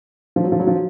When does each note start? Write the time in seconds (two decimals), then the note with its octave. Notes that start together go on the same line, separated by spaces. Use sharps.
0.36 F3
0.44 F#3
0.52 F3
0.59 F#3
0.67 F3